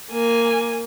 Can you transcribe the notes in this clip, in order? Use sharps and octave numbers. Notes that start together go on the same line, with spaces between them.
A#3 G#5